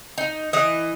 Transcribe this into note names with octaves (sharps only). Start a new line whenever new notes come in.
D#4
E3 D#5